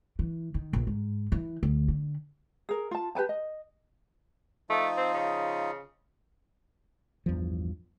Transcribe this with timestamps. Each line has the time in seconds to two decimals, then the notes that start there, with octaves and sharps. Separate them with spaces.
0.19 E3
0.54 D#3
0.73 A#1
0.87 G#2
1.32 E3
1.63 D2
1.88 D3
2.69 G#4 A#4
2.91 F4 A5
3.15 G4 B4 G#5 A5
3.29 D#5
4.70 F3 A3 D#4 F4
4.97 C4
5.14 C#3
7.26 A1 E2 G2 F3